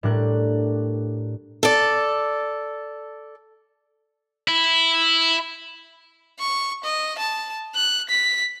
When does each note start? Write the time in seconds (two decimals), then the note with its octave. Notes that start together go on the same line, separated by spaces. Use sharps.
0.03 A2 G3 D4 A#4 F#6
1.63 A4 D5
4.48 E4
6.39 C#6
6.84 D#5
7.18 A5
7.75 F#6
8.09 B6